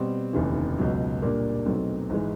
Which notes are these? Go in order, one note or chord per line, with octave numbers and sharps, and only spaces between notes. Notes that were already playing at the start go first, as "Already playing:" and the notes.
Already playing: B2 G3 C4
F1 D#2 C#3 E3
C#2 B2 F#3
A#2 G3 A#3 D4
B1 B2 F#3 A3 C4
G#1 E3 G#3